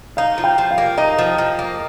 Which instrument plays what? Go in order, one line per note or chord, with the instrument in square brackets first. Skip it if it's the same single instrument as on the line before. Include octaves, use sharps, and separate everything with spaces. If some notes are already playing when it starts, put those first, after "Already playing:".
[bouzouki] D#4 [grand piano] F5
[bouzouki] F3
[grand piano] G5
[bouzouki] F3
[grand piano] F5
[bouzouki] A#3
[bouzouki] D#4 [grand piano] D#5
[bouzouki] F3
F3
A#3